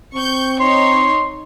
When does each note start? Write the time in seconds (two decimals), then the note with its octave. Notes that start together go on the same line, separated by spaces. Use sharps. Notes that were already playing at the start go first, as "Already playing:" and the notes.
0.15 C4 C#6 G6
0.60 D#4 C#5 C6